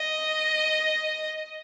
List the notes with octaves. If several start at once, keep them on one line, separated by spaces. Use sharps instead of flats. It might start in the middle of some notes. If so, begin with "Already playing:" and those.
Already playing: D#5